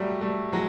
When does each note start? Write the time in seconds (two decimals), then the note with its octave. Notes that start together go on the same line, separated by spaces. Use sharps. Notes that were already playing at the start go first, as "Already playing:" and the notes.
Already playing: F#3 G3 A3
0.21 G3 A3
0.52 F#3 G#3